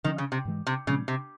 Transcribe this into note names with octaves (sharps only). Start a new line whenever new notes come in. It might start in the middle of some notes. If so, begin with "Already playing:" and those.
D3 D#3 F3 A3 C#4
C#3
C3
G#2 E3 G#3
C3
A#2 C#3 F3 G#3 C4
C3